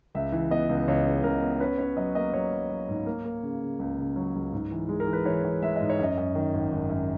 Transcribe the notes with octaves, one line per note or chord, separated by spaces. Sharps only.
C#2 E5
E3
B3 D#5
C#2
C#2 C#5
C#3
C#2 A#4
B3
C#4 B4
C#4 C#5
F#3 D#5
A#3 D#5
F#3 C#5
F#3
F#3
G#2
A#3
A#3
C#3
C#3
C#2
C#3
F#3
C#2
G#2
E3
G#3
A#4
E3
B4
E3 C#5
E3
G#3 E5
G#2 D#5
C#5
F#2 D#5
F#2
D#3
G#1
G#1
F#2